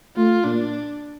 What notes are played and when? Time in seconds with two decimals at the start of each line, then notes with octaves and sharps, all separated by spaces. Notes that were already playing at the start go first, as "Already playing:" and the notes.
0.16 A3 F4
0.45 A#2 D4